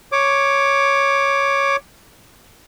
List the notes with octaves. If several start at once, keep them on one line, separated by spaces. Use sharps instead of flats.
C#5 D6